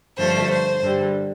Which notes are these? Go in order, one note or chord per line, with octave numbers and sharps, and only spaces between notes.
G2 D3 F3 A3 C5
C5
G2 D3 G3